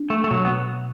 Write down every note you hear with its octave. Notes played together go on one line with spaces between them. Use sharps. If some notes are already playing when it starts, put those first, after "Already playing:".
Already playing: D4
A3
A3
B2 F#3
B3